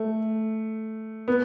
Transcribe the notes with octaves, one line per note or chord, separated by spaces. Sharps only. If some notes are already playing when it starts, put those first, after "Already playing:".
Already playing: A3
B3